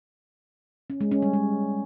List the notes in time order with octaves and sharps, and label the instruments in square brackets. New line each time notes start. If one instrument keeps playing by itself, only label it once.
[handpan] C#4
G#3
C#4
G3
G#3